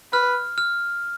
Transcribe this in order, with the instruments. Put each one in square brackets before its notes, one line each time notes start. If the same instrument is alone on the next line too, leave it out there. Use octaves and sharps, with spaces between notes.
[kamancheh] B4 [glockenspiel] F6
[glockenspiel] F6